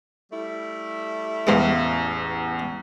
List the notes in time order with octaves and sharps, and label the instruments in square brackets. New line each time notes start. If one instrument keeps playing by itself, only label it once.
[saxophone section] G3 A3 E4
[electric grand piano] A1 E2 F5 [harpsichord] G#3 B3 C5